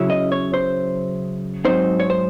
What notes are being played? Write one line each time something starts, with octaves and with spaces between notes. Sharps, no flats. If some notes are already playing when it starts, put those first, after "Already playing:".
Already playing: C#3 F#3 C#4 E4
D#5
C#5
C5
G#2 F#3 C4 D#4 C5
C#5
C5